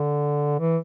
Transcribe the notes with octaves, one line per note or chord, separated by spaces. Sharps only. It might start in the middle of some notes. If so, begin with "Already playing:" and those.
Already playing: D3
E3